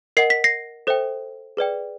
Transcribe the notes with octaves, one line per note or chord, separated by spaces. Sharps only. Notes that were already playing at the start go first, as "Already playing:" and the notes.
A#4 D#5 F#5 C7
B6
A#6 C7
A4 C5 E5 G5
G#4 B4 D5 G5